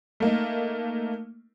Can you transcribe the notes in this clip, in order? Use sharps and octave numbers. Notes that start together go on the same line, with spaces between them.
A3 A#3 D#4